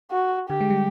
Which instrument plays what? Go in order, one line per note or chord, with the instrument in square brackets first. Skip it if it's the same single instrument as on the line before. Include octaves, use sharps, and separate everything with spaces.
[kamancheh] F#4
[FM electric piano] D3 [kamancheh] G4
[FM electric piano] G#3
G3